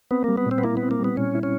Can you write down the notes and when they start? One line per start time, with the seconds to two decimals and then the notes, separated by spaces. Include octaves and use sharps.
0.11 B3 C4
0.24 G3 A#3
0.37 B3
0.46 A#2 C4
0.58 B3
0.64 A#3 E4
0.77 B3
0.82 C4
0.91 A#3
0.99 G3
1.04 B3
1.17 A#2 C#4
1.35 E4
1.43 C#4